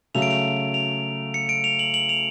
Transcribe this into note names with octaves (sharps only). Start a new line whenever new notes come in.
C#3 F#3 A3 F7
D7
F7
F7
C#7
D7
F7
F#7
F#7
F7